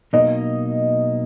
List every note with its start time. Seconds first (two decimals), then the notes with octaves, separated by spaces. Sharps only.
0.13 B2 F#3 A#3 D#4 D#5